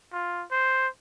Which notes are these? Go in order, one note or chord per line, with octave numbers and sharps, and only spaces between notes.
F4
C5